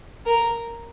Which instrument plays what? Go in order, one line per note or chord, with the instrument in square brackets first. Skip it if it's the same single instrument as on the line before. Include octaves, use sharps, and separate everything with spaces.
[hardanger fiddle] A#4